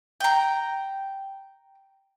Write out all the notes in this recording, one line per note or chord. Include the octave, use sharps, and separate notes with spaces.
G5 A#5